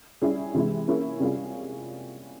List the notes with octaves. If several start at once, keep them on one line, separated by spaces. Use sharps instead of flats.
G3 C#4 E4 G#4
C3 E3 G#3 E4
A#3 C#4 E4 G#4
C3 G3 C#4 F4 G#4